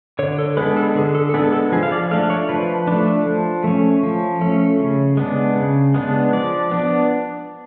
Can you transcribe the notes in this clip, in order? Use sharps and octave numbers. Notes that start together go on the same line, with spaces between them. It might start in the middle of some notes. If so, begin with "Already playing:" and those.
D3 C#5
A4
G#3 B3 D4 B4
A4
D3 G#4
A4
A4
G#3 B3 D4 G#4
A4
F3 G#4
F5
D5
A3 D4 F5
C#5
F3 B4
A3 D4
F3
A3 C#4
F3
A3 C#4
C#3
G#3 B3 D4
C#3
G#3 B3 D4
F3 D5
B3 D4